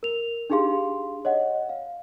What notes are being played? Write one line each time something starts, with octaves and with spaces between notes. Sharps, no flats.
A#4 F7
D4 D#4 G4 G#4 F5 C6
C#5 D#5 F#5
F5